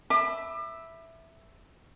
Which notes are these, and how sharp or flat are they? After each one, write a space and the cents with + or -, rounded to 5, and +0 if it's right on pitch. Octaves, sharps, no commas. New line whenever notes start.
E5 +0 B5 +0 D6 +35